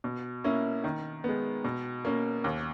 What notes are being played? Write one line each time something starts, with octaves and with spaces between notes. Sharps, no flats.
B2
A#3 C#4 E4
D#3
G#3 B3
B2
A#3 C#4
D#2